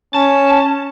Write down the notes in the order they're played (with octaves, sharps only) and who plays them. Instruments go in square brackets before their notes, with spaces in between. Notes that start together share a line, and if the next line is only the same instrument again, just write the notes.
[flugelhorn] C#4 [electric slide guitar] A5